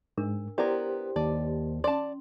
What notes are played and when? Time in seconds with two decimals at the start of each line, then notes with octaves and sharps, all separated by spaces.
0.18 G#2 D4 A#4
0.58 B3 E4 G4 A#4 C5 D5
1.16 D#2 D5 A5
1.84 C#4 D5 A5 C6